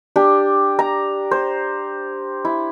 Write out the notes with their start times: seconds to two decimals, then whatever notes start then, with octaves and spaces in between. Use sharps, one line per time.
0.16 D4 G4
0.79 A#5
1.31 C5
2.45 E4